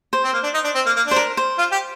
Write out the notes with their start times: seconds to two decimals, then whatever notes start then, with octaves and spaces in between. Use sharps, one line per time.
0.13 C5
0.24 C4
0.33 A#3
0.43 D4
0.54 D#4
0.64 D4
0.75 C4
0.86 A#3
0.96 A#3
1.07 D4 C5
1.16 A#4
1.37 C5
1.58 F4
1.72 G4